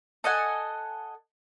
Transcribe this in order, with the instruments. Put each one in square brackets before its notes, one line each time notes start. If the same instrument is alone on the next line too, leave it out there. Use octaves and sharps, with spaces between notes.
[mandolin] A4 D#5 F#5 G#5